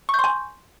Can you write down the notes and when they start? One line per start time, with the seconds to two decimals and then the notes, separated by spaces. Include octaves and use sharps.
0.09 C#6
0.14 G6
0.19 C6
0.24 G#5